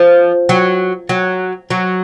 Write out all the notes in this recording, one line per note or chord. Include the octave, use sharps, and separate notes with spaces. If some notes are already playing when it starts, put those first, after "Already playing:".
Already playing: F3
F#3
F#3
F#3